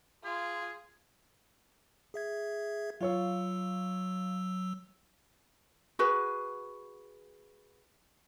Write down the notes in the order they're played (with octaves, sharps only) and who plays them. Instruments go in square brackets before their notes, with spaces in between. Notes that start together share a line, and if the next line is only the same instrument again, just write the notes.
[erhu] F4 [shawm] G#4
[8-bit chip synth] G#4 E5 G#6
[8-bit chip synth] F#3 E6 [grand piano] F4 C#5 F5
[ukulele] F#4 G#4 B4